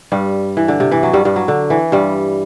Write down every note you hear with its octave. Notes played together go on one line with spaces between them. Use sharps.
G2 G3
E3
D3
C3
E3
F#3
G2 G3
G2 G3
F#3
D3
E3
G2 G3